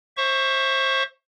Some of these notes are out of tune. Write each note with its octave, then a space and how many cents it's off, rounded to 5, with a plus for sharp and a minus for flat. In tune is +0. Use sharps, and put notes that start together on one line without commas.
C5 +25 E5 +0 C#6 +0